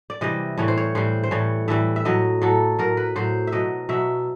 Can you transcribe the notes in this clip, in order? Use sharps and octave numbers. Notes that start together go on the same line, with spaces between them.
D5
C3 E3 G3 D#5
A2 E3 G3 C#5
C5
C#5
A2 E3 G3 C5
C5
A2 E3 G3 C#5
A2 E3 G3 E5
E5
A2 F#3 D#5
A2 F#3 A4
A2 F#3 A#4
B4
A2 F#3 C5
E5
B2 F#3 D#5
B2 F#3 E5